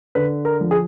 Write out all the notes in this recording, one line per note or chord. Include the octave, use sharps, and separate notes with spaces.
D3 B4
A#4
F3
G#4